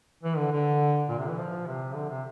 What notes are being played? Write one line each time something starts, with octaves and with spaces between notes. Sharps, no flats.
E3
D3
D3
A#2
C3
E3
F3
C3
D3
C3